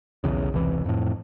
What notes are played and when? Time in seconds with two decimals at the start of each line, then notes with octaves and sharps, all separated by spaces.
0.24 B1 E2 C#3
0.52 E1 C2 E3
0.86 F2 A2